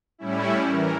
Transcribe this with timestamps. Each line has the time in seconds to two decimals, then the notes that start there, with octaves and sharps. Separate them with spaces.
0.18 A2 G3 C#4 E4
0.68 E3 A#4